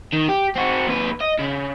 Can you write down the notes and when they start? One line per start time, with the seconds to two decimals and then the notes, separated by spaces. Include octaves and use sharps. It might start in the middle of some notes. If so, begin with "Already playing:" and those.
0.13 D#3
0.29 G4
0.56 C4 F#4
0.87 D#2 B4
1.20 D#5
1.39 C#3